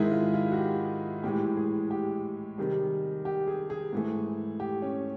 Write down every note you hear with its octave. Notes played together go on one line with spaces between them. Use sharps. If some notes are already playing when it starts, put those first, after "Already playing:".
Already playing: G#2 D#3 G#3 E4
F4
F4
F#4
G4
A2 E3 G#3 G4
G#4
G4
C3 D#3 G3 G#4
G4
G#4
G#4
G#2 E3 A3
G4
C#4